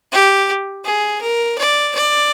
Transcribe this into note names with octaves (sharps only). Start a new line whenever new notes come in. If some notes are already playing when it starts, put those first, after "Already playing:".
G4
G#4
A#4
D5
D5